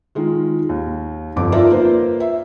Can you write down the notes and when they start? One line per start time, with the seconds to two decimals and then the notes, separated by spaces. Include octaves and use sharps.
0.15 D#3 G#3 F4
0.69 D#2
1.36 G1 F2 D6
1.52 D#4 F4 A#4 D5 E5
1.70 A#3 F4 B4 C5
2.20 E5